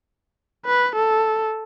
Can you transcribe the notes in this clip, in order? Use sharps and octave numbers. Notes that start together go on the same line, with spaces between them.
B4
A4